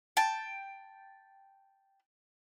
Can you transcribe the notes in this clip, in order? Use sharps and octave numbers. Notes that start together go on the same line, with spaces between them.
G5 A5